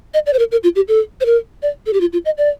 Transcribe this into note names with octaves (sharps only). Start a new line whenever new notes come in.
D#5
D5
C5
A#4
A#4
F4
G4
A4
C5
A#4
D5
A4
G4
F4
F4
D#5
D5